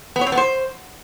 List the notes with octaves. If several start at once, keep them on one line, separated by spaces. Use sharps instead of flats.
B3
C#5
C4
B3
C5